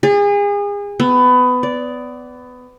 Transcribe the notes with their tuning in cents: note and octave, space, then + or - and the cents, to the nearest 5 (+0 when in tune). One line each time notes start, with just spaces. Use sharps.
G#4 -35
B3 +20
D5 -10